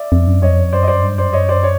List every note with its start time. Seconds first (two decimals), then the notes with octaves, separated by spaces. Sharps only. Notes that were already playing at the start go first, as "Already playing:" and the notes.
Already playing: D5 E5
0.12 F2
0.27 F#2
0.42 F2 C#5 D#5
0.72 F#2 C5 D5
0.83 D#5
0.87 C5 D5
1.03 G2
1.18 F#2 C5 D5
1.33 C#5 D#5
1.49 C5 D5
1.63 C#5